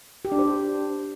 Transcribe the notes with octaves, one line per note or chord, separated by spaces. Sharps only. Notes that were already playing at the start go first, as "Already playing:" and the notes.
G4
D4
C5